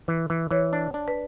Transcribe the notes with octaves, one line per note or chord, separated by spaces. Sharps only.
E3
E3
E3 C#5
D4
D4
B4